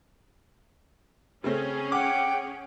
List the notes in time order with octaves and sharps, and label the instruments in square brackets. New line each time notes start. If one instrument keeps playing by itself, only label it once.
[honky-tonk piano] C#3 A3 C4 [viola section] C#4 G#4
[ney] F#5 [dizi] G5 [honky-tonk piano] D6